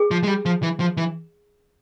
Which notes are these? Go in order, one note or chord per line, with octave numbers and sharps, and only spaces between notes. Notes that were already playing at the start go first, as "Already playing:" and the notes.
Already playing: G#4
F3
G#3
G3
F3
E3
F3
E3